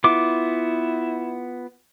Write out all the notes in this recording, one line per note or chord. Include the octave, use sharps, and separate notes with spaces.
B3 E4 F4 D6